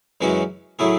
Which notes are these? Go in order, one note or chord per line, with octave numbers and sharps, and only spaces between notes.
F#2 E3 G#3 C#4 F#4
A2 F#3 A3 E4 G#4